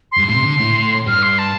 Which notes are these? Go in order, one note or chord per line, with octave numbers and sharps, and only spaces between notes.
C6
G2
A2 C6
C3
D3
A2
G2 F6
C6
A5